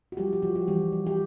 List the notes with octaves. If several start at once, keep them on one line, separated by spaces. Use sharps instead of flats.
F#4
F3 G3 G4
G4
F3 F#4
F#4
E3 G3 G4
G3
G4